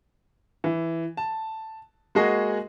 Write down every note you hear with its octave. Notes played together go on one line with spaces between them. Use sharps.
E3
A5
G#3 A#3 F#4 G#4 D#5